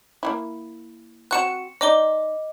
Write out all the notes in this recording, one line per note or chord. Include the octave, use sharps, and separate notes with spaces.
A#3 D#4 E4
C4 F#4 F#6 C#7 E7
D#4 D5 D#5 D6 G7